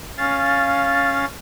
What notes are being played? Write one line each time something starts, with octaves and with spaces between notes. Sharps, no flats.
C#4 F5 A6